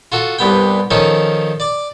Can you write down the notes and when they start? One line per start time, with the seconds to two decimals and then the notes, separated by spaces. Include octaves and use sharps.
0.12 F4 F#4 A4
0.38 C2 G2 B3 G5
0.91 D#3 F3 C#4 D#4 A4
1.60 D5 D6